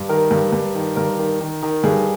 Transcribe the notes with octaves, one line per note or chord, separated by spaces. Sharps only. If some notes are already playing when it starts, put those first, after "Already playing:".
Already playing: G2
D#3 A#4
G2
G2
D#3
G2 A#4
D#3
D#3
D#3
G2 G#4